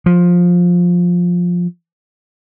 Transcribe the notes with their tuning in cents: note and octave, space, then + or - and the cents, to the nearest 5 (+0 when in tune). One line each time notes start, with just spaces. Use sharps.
F3 +10